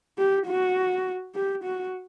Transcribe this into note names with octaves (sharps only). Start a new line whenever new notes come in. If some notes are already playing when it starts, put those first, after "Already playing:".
G4
F#4
G4
F#4